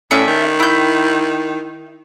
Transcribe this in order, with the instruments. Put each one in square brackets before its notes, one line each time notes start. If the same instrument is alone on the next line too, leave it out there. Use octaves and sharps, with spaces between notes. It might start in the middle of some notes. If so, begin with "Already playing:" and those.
[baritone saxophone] A2 [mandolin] C#4 D4 E5
[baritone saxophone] D#3
[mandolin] E4 G6